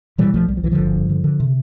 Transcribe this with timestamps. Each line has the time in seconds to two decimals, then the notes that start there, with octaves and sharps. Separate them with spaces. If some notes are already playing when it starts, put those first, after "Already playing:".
0.18 B2 E3 G3
0.34 B1 F3 A3
0.48 B1 G3
0.57 F3
0.63 B1 E3
0.72 D3 F3
0.79 G1
0.95 G2
1.09 D3
1.24 D3
1.40 C3